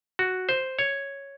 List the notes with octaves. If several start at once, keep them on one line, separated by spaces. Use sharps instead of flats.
F#4
C5
C#5